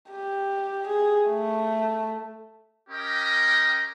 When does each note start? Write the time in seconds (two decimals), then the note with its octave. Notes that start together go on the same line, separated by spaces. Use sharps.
0.11 G4
0.88 G#4
1.28 A3
2.89 C#4 G4 A#4 D#5 G5 A#5